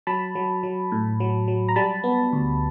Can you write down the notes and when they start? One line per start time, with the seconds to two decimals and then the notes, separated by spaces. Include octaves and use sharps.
0.07 F#3 A5 B5
0.35 F#3
0.63 F#3
0.92 A2
1.20 F#3
1.48 F#3
1.69 A#5
1.76 G3 A5 B5
2.04 B3
2.33 D2